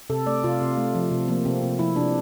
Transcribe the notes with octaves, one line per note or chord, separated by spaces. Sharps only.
C3 A4
A3 D5
C3 F4
C3
A3
F3
C3
F3 A#3
C3 C4
C3
F3 E4
C3 D4